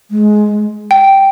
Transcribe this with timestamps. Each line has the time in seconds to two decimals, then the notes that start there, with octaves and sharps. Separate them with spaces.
0.11 G#3
0.91 G5